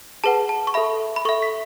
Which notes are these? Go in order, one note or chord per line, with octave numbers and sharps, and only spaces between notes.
G#4 B4 F#5 A5
A5
C#6
A4 E5 B5
B5
A4 E5 C#6
B6